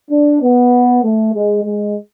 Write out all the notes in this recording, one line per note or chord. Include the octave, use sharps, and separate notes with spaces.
D4
B3
A3
G#3
G#3